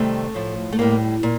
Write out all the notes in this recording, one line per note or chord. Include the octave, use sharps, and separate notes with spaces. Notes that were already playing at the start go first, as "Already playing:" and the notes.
Already playing: C3 D#3 G3 A3
A2 F3
A3
A2 G3 A#3
A#2